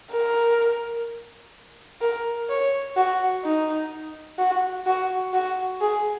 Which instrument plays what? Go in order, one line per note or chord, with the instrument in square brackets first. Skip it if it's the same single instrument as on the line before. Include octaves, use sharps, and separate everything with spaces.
[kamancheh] A#4
A#4
C#5
F#4
D#4
F#4
F#4
F#4
G#4